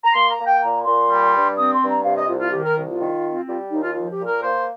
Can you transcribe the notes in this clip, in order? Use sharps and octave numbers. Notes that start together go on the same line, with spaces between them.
A#5
A#3 C6
A#5
A#3
G5
A#2 A#5
A#2 C6
G3
G2
C4 D#6
C6
G2
A#5
C3 F5
D#5
C2 F4
F4
D#3 G4
A#4
C2
F4
D#3
C4
G3 F4
D#2 D#4
F4
F3 F4
G4
A#2
A#4
A#3 C5